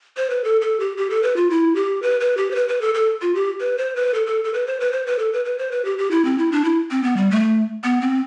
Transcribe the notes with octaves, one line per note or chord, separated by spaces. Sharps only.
C5
B4
A4
A4
G4
G4
A4
B4
F4
E4
G4
B4
B4
G4
C5
B4
B4
A4
A4
F4
G4
B4
C5
B4
A4
A4
A4
B4
C5
B4
C5
B4
A4
B4
B4
C5
B4
G4
G4
E4
C4
E4
D4
E4
C4
B3
G3
A3
B3
C4